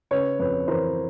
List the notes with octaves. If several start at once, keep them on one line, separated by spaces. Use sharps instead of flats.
C#3 B4 C#5
F2 B4 C#5
E3 A#4 C5